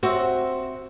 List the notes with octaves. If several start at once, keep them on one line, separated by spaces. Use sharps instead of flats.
C4 F#4 E5